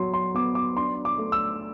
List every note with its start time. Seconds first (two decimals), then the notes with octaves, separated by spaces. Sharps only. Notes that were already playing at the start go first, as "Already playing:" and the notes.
Already playing: F#3 B3 C6
0.14 C6
0.35 B3 D6
0.55 D6
0.77 D4 C6
1.05 D6
1.18 A3
1.32 E6